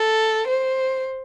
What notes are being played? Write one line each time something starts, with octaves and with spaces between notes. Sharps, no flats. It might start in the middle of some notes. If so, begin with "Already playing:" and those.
Already playing: A4
C5